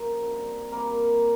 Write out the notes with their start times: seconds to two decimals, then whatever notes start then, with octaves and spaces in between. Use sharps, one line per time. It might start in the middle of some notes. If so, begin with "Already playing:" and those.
Already playing: F#2 C#3 F3 A#3 C5
0.23 D3 G3 C4
0.72 A#2 G3 A#3 C4 A#4